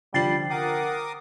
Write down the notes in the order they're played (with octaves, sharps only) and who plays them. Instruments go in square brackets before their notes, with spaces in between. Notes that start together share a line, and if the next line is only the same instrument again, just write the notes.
[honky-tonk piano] D3 F3 F#7 [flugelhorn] G3 [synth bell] G5 A6 C7
[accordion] A#4 D6 D#6 [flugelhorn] F#5